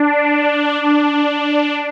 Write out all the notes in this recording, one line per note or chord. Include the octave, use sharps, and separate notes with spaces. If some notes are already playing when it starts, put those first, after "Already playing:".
Already playing: D4
D4